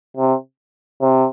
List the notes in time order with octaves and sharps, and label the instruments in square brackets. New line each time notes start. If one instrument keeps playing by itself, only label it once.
[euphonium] C3
C3